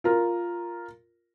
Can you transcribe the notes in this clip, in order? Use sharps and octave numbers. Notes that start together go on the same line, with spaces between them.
F4 A#4